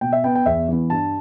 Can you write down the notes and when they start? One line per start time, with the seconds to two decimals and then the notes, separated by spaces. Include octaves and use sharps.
0.01 B2 G5
0.13 E5
0.24 B3 G5
0.35 G5
0.46 E2 E5
0.68 E3 B3
0.90 G2 A5